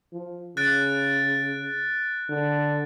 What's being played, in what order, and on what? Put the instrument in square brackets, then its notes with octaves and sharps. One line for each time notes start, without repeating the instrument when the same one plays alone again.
[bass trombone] F3
[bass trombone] C#3 [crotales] F#6 A6 D7
[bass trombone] D3